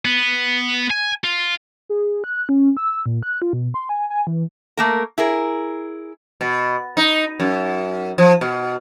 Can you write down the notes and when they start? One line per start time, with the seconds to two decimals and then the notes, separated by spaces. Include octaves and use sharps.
0.05 B3
0.91 G#5
1.24 F4
1.89 G#4
2.24 F#6
2.49 C#4
2.77 E6
3.06 A#2
3.23 F#6
3.42 F4
3.53 B2
3.74 C6
3.89 G#5
4.10 G#5
4.27 E3
4.77 A3 A#3 A#4
5.18 E4 G#4 A#4
6.41 B2
6.97 D#4
7.40 F#2
8.18 F3
8.41 B2